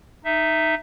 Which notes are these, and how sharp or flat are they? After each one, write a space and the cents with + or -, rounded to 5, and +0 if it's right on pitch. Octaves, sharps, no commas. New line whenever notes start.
D#4 -10 E5 +0